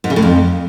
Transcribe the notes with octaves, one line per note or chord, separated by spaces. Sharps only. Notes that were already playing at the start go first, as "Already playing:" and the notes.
G#2
C#3
A2
F2